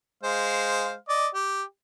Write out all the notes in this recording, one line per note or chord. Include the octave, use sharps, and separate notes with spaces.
G#3 C5 F5
D5 D#5
G4